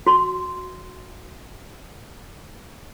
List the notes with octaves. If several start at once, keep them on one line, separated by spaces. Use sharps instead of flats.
F#4 C6